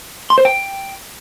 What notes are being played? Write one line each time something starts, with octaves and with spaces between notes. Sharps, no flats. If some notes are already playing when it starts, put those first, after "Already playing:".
C6
C5
G5